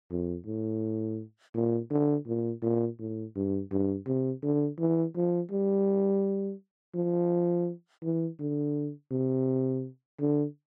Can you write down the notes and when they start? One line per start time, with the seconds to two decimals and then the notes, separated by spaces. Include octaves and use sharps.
0.11 F2
0.46 A2
1.54 A#2
1.91 D3
2.27 A#2
2.62 A#2
2.99 A2
3.35 G2
3.71 G2
4.06 C3
4.43 D3
4.79 E3
5.16 F3
5.51 G3
6.95 F3
8.03 E3
8.40 D3
9.11 C3
10.20 D3